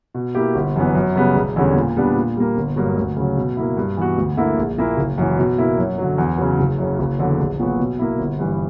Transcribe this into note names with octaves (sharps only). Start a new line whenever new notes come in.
B2
A#3 E4 G4
G1
F#2 E3 B3
F#2
C#3 G3 B3
E1
E2 D3 G3 C#4
A#2
G3 B3 D4
A#2
G3 A#3
G1
G2 F#3 A#3
D2
C#3 F#3
B2
A#3 E4
G2
E3 B3 F#4
D2
D3 A#3 E4
A#1
A#2 A#3 E4
F#1
F#2 E3
B2
A#3 E4
F#2
D3 F#3
E2
C#3 F#3
F#1
F#2 C#3
F#1
E2 D3 F#3
A#1
A#2 F#3 B3 F#4
B2
A#3 E4
G1
G2 E3